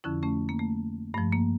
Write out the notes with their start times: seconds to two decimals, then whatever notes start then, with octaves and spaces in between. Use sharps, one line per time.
0.04 F2 D3 F3 C#4 E4
0.23 A3 C#4
0.49 A#3
0.59 A3
1.14 G2 A3
1.18 F3
1.33 A#3